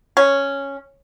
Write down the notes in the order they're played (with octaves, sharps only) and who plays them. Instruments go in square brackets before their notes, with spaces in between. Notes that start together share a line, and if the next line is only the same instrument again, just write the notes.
[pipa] C#4